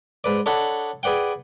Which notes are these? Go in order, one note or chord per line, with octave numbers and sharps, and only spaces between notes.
G#2 B4 D5
D4 D#4 A4 C#5 F#5 B5
G#4 B4 D5 F#5 G5